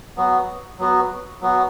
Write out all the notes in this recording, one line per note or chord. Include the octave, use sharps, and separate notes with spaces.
F#3 B3 F#4
F#3 B3 F#4
F#3 B3 F#4